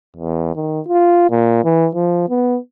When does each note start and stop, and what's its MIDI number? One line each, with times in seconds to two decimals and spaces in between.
0.17 0.54 40
0.56 0.80 51
0.88 1.30 65
1.31 1.62 46
1.65 1.89 52
1.95 2.26 53
2.29 2.58 59